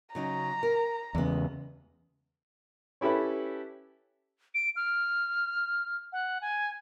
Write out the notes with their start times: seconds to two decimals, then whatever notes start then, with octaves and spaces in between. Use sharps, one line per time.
0.15 C#3 F#3 D#4 A#5
0.63 A#4
1.15 E2 C#3 G#3 B3
3.01 C#4 E4 G4 A4 B4
4.55 D7
4.76 F6
6.12 F#5
6.41 G#5